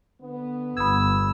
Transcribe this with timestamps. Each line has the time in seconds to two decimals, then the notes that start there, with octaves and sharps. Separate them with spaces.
0.21 D3 B3
0.77 G1 B5 D#6 E6 G#6